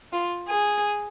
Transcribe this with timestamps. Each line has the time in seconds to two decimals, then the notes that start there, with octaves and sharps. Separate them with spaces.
0.13 F4
0.49 G#4